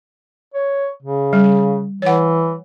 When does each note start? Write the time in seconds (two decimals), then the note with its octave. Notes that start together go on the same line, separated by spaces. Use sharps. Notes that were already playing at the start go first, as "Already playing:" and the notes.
0.54 C#5
1.03 C#3
1.33 G3
2.02 E3 C#5 F#5